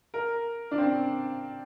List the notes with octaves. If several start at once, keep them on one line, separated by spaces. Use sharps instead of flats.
A#4
D4
C4